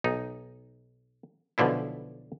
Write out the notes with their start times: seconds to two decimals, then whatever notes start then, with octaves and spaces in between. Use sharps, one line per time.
0.04 B1 D#4
1.58 B1 B2 D3 F3 E4